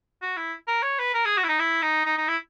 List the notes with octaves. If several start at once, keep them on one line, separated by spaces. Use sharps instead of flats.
F#4
E4
A#4
C#5
B4
A#4
G#4
F#4
E4
D#4
E4
D#4
D#4
D#4
E4